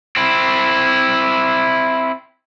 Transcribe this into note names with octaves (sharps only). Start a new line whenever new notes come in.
C4 E4